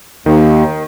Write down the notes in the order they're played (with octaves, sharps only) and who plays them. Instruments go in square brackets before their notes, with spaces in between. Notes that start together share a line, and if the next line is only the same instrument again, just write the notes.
[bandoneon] D#2 [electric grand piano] D#3